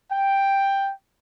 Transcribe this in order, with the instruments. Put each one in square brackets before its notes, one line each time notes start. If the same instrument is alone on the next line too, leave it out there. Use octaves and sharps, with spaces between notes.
[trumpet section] G5